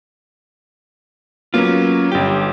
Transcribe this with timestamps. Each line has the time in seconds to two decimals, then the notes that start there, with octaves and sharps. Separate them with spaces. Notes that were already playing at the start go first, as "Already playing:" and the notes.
1.54 F#3 A#3 B3 C#4 F4
2.12 G1 G4 G5